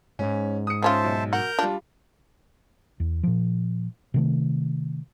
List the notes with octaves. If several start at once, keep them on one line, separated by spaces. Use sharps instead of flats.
G#2 C#4
D#6 C#7
F3 C#4 F4 C5 E5 A5
B1
F#4 A#4 A#5 G6
G3 D4 F4
E2
A#2 F3
C3 D#3 A3